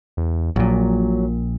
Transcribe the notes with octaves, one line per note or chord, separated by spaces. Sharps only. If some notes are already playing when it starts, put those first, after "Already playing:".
E2
A#1 A#2 F#3